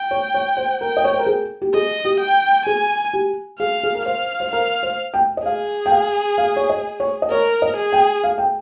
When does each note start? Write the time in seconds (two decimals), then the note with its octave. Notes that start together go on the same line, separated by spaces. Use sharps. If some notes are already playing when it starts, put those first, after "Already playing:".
Already playing: G5
0.11 C#5
0.34 C#5
0.57 C5
0.80 A#4 G5
0.97 D#5
1.05 C#5
1.12 C5
1.19 A#4
1.26 G#4
1.62 G4
1.74 G#4 D#5
2.05 G4
2.21 G5
2.66 G#4 G#5
3.13 G4
3.60 G#4 F5
3.83 G#4
3.95 A#4
4.06 C5 F5
4.40 C5
4.52 A#4 F5
4.83 C5
5.14 G5
5.37 D#5
5.45 G#4 F5
5.86 G5
5.91 F5
6.38 F5
6.56 C#5
6.69 D#5
7.00 C#5
7.22 D#5
7.30 A#4 C#5
7.62 D#5
7.77 G#4
7.92 G5
8.23 F5
8.38 G5